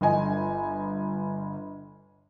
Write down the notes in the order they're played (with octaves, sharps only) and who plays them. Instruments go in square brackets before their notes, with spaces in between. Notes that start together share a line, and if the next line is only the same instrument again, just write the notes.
[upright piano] G1 D#5 G#5